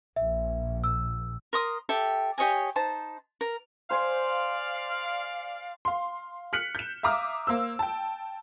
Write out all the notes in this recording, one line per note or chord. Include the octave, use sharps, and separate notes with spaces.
A#1 E5
E6
A#4 C6 D#6
G4 A4 E5 G5
G4 C#5 D#5 G#5
D#4 C5 A5
A#4
C5 D5 F5 G#5
F5 C6
F6 F#6 B6 C#7 F#7
G6 E7
E5 F5 A#5 D6 D#6 F6
A#3 C5 E6
G5 A5